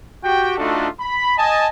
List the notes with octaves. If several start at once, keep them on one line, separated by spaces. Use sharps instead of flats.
F#4 G4 G5
A3 D4 D#4 F4 F#4 A4
B5
D#5 G#5 A5